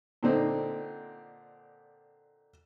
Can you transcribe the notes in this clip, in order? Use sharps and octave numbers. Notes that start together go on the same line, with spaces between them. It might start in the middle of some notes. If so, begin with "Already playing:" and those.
A#2 D3 C4 D#4